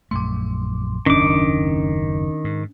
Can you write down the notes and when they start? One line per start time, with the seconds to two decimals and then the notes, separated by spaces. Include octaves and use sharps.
0.11 A#1 F#2 A3 C6 D6
1.06 F#1 D#2 G#2 D#3 C#4 D4 D6
2.44 G#2